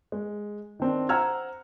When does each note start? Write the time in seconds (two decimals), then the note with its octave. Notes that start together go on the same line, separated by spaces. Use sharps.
0.12 G#3
0.80 D#3 C4 D4
1.09 C5 F#5 A#5 E6 F6 G#6